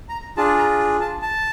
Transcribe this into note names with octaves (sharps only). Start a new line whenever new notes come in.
A#5
D4 F4 G#4 A5
A#5
A5
A5